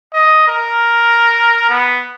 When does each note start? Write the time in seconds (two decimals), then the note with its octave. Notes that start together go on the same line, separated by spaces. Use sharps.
0.13 D#5
0.48 A#4
1.69 B3